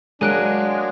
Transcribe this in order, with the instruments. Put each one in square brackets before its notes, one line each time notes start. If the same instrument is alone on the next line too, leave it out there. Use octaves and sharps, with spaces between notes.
[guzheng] F#3 A#3 [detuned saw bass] G#3 [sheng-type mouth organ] D4 [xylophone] G#5 F#6 D7